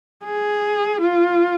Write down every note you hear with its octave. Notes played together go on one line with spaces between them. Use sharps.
G#4
F4